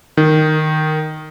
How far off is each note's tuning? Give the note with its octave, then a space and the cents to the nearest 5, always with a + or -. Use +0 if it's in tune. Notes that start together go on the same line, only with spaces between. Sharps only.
D#3 -5